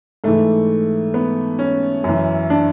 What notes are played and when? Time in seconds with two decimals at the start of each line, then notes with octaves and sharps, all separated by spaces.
0.24 G#2 E3 A3
1.14 B3
1.59 C#4
2.04 F#2 E3
2.50 D4